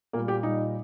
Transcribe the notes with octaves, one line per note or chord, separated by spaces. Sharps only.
A#2 G3 A#3
G4
A#2 G3 D#4